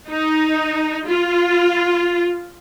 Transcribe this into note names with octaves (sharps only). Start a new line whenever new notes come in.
D#4
F4